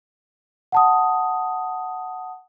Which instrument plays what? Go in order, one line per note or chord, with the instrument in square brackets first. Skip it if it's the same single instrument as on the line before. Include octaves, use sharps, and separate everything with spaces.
[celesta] F#5 A5 D#6